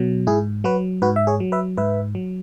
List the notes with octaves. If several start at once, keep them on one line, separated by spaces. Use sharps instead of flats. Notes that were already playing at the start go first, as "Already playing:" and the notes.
Already playing: B2 F#3
G#2 E4 G#4
F#3 F#4 B4
G#2 F#4 B4
E5
G#4 C#5
F#3
B4 E5
G#2 B4 E5
F#3